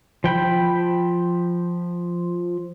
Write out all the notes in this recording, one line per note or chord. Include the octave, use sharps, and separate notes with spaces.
F3 G5 B5 G6